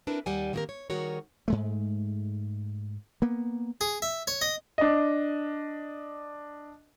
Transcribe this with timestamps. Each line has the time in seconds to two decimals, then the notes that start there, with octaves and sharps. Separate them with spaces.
0.07 C4 D4 E4 A#4 B4
0.26 D#2 G3 D5 F#5 G#5
0.53 D#3 A#3 C4 F#4 G4 A#4
0.69 C#5
0.90 D#3 G3 F#4 G#4 A#4 C#5
1.48 G#2 G#3 A3
3.22 A#3 B3
3.81 G#4
4.02 E5
4.27 C#5
4.41 D#5
4.78 D4 D#5